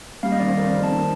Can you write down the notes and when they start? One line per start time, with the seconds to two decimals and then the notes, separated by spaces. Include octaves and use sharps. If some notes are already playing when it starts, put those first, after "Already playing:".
0.23 G3 F5
0.32 D#5
0.40 D#3 D5
0.49 C5
0.57 F2 A#4
0.65 C5
0.74 F2
0.83 A5
0.91 D#3